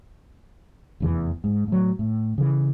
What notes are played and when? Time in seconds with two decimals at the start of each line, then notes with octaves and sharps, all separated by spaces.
1.00 F1 E2 E3
1.44 G#2
1.68 A2 F#3
1.99 A2
2.38 C#3 E3